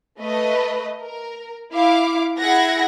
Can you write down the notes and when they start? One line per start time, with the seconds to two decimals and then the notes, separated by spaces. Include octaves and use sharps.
0.19 A3 B4 D#5
1.00 A#4
1.72 E4 F5 D6
2.38 E4 G#4 F#5 G#6 A#6